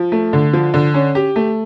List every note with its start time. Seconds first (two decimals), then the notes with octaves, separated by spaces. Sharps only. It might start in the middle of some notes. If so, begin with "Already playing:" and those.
Already playing: F3
0.12 A3
0.33 D3
0.53 F3
0.74 D3
0.94 C#4
1.15 G4
1.36 A3